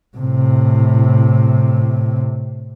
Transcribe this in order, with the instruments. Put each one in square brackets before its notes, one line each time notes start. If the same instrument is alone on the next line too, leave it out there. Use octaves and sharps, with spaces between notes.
[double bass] A2 C3